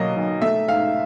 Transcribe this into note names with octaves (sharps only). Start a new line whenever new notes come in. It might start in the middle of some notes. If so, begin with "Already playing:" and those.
Already playing: B1 B2 F#3 A#3 D#5
B1
A3 E5
G#2 F5